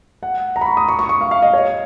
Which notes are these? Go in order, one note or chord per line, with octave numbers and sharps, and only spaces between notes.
F#5
A#5
B5
C#6
D#6
C#6
C#6
C#6
F5
F5
D#5
C#5